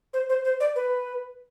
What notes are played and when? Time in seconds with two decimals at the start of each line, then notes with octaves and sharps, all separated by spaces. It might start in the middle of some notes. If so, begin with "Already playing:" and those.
0.14 C5
0.29 C5
0.44 C5
0.60 D5
0.76 B4